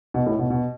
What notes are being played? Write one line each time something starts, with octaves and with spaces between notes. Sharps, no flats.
B2
A2
B2
B2